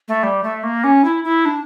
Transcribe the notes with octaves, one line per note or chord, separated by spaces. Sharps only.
A3
G3
A3
A#3
C#4
E4
E4
D4